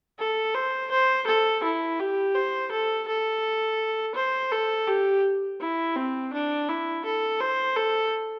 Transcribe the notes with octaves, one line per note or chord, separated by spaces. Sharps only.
A4
C5
C5
A4
E4
G4
C5
A4
A4
C5
A4
G4
E4
C4
D4
E4
A4
C5
A4